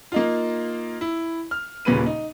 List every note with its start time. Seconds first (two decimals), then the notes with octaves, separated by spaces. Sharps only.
0.12 A#3 D#4 F4
1.01 E4
1.51 F6
1.85 D#1 A#2 C#3 B4 D#7
2.06 D#4